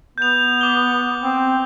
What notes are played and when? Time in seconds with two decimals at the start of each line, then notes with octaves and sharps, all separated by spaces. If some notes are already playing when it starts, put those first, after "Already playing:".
0.18 B3 G6 F7
0.61 D6 G7
1.21 C4